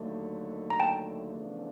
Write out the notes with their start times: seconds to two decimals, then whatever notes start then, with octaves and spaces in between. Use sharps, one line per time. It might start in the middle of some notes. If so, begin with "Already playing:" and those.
Already playing: D#2 D3 F#3 A3
0.70 A#5
0.80 G5 A5
1.35 E2 C#3 F3 A3 D4